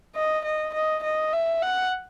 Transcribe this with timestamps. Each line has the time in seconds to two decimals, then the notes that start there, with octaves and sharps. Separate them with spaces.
0.15 D#5
0.44 D#5
0.74 D#5
1.03 D#5
1.33 E5
1.62 F#5